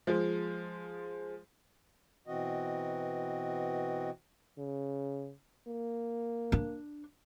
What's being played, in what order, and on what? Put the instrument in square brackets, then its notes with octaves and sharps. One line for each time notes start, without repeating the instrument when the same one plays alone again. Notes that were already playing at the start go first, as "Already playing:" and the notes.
[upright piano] F3 G#3
[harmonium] B2 E3 C4 F#4 D#5
[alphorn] C#3
A#3
[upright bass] D4